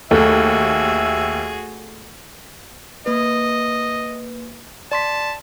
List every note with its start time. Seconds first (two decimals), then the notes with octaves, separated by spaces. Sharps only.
0.11 D#2 A3 F#4 G#4 E5
3.06 A#3 B4 D#5
4.92 D5 A5 C6 B6